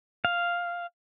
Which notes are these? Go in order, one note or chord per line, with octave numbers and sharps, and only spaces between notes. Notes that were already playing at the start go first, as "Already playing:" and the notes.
F5